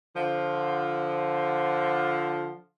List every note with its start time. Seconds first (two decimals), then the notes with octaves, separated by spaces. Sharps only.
0.16 D3 F3